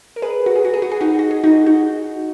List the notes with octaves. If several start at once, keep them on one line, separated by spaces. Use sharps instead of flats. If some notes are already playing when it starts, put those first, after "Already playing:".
A#4
G#4 B4
F#4
G#4
F#4
G#4
F#4
G#4
D#4 F#4
F#4
G#4
D#4 F#4
D#4 F#4